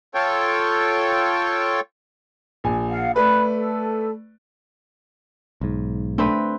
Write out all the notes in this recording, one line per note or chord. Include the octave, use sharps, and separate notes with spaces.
F4 A4 C#5 G5
A#1 G#5
F5 F#5
A3 B4 D5 B5 F#6
A4
B1 G#2
A3 C4 D4 B4